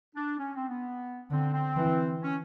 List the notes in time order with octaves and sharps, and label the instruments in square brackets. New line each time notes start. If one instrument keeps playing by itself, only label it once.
[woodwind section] D4
C#4
C4
B3
[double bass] D3 [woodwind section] C4
[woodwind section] C4
[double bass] E3
[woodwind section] C#4